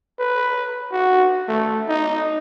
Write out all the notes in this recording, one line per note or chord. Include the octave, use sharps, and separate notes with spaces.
B4
F#4
A3
D#4